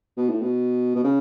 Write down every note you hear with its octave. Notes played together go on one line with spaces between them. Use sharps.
B2
A2
B2
B2
C#3